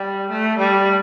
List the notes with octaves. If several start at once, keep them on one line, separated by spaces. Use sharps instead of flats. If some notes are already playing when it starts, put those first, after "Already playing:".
Already playing: G3
A3
G3